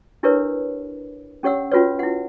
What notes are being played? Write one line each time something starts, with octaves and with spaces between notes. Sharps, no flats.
D4 E4 G4 A#4 B4 C#5
C#4 G4 C#5 F#5 E6
C#4 F4 F#4 B4 C#5
E4 F#5